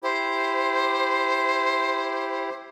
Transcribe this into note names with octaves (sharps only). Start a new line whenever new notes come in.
E4 G4 C5